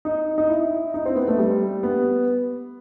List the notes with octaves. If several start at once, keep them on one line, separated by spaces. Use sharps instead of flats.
D#4
D#4
E4
D#4
C4
B3
A3
G3
B3